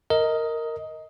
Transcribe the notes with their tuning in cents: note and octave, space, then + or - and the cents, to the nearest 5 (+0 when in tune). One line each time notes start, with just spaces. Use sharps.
A#4 -10 D#5 +15